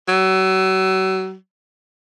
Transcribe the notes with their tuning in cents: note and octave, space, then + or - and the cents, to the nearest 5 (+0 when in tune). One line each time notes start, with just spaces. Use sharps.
F#3 +35